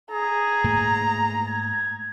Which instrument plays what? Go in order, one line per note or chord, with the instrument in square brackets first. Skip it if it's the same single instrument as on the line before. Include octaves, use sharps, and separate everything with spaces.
[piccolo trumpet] G#4 [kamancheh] A#5
[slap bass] G#2 A3 A#3
[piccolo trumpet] G#6